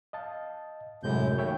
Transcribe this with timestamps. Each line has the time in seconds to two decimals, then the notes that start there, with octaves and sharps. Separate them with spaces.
0.13 D#5 F5 A5
1.03 F#2 A2 C3 G#3 E4 G6
1.38 D#2 C#5 E5 G5